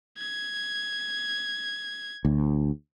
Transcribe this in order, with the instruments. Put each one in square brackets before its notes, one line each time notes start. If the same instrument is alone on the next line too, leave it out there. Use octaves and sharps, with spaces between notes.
[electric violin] G#6
[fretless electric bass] D2